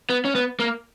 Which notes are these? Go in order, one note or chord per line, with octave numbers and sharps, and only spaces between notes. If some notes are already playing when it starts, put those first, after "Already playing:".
B3
C#4
B3
A#3